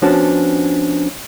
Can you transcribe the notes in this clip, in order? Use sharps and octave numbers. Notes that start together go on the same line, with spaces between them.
F3 B3 C#4 D4 F#4